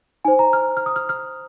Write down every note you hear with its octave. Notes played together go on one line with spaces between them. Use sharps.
D#4 C5 G#5
A#5
F6
F6
D#6
F6
F6